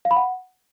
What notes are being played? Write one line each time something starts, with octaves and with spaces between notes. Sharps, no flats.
F5
B5
F#5